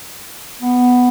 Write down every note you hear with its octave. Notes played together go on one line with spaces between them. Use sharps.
B3